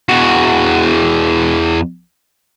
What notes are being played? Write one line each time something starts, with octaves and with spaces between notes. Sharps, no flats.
E2 F#4